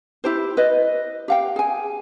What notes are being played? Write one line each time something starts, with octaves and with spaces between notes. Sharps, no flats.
E4 G4 C5
B4 D#5
G4 F5 G5
G#4 G#5